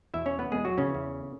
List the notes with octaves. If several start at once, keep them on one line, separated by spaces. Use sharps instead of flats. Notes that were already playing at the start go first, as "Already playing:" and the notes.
E2 B2 E4 E5
C#4 C#5
B3 B4
E2 B2 G#3 G#4
F#3 F#4
C#3 C#4
E2 E3